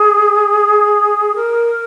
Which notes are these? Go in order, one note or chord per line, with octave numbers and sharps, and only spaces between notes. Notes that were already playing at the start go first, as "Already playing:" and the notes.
Already playing: G#4
A#4